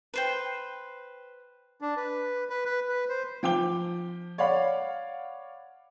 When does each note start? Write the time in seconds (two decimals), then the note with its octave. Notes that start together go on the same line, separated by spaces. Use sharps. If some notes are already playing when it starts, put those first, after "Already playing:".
0.14 B4 C5 G5
1.81 D4
1.97 B4
2.50 B4
2.65 B4
2.89 B4
3.09 C5
3.43 F3 G5 D6 G7
4.38 C#5 D5 F5 F#5 B5